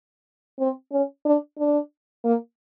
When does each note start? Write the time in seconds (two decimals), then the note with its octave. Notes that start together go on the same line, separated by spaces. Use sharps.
0.59 C4
0.92 C#4
1.25 D4
1.59 D4
2.24 A#3